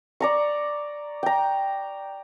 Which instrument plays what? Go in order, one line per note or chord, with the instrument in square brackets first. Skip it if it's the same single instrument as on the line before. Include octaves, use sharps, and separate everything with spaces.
[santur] D5 A#5 C#6
G5 A#5